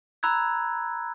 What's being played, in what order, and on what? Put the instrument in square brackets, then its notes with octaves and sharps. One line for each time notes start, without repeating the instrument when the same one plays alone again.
[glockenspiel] A#5 B5 E6 F#6 G#6